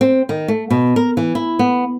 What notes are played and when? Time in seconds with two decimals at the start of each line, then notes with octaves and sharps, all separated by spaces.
0.01 C4
0.29 D#3
0.48 A3
0.71 B2
0.96 A#4
1.17 E3
1.35 E4
1.59 B3